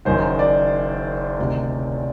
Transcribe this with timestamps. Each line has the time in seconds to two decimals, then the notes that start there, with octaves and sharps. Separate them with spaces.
0.05 F#1 F#2 D#3 C5
0.39 D5
1.38 D2 C3 D#3